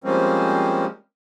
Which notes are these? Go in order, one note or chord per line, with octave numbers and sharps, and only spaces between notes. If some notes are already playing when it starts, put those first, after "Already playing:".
F3 G3 G#3 A#3 C4 C#4